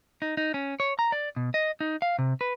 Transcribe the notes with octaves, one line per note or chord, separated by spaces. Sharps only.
D#4
D#4
C#4
C#5
A#5
D5
B2
D#5
D#4
F5
C3
B4